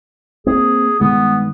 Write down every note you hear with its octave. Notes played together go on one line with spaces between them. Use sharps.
A#3 C4 G#4
G2 D#3 G#3 B3